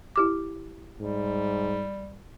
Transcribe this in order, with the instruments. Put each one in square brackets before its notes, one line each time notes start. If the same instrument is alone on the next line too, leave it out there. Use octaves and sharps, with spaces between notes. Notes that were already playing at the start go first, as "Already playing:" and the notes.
[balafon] E4 G4 D6
[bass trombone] G#2 [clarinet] G3